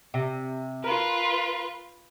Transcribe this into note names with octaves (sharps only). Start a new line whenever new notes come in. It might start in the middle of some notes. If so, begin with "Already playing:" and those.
C3
F4 A#4 B4